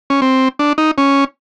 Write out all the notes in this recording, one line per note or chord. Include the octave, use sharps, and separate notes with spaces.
C#4
C4
D4
D#4
C#4